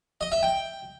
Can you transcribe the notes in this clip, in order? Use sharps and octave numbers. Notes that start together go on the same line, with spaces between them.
D#5
E5
G5